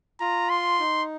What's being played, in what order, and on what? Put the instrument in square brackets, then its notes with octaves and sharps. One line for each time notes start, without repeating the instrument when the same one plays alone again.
[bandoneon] F4 [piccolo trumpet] A#5
[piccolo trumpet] C6
[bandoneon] D#4